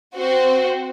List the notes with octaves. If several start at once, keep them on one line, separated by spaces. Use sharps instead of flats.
C4 F#4 C5